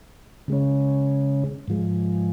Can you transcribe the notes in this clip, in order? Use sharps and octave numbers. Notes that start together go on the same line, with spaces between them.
C#3 G#3 C#4
G#2 F3 G#3